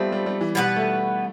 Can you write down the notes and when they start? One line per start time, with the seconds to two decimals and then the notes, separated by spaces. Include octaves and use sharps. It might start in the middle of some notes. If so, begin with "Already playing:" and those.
Already playing: F3 G3 A3 B3 C4
0.12 G3
0.26 G3
0.41 E3
0.55 B2 G3 B3 F4 B4
0.77 A3